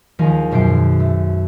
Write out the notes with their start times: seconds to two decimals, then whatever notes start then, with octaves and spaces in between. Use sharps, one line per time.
0.19 D#2 F3 G#3 G#4 A#4
0.51 B1 F#2 B2 C5 C7 D7
1.00 A3